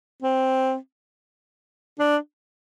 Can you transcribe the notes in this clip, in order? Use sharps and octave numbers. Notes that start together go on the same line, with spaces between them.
C4
D4